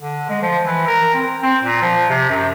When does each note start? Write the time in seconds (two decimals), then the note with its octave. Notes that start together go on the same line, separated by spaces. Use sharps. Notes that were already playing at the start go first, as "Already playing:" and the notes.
0.02 D3
0.29 G#3
0.42 F3
0.65 E3
0.87 A#4
1.14 C4
1.42 C4
1.63 A#2
1.82 F3
2.10 C3
2.30 F#2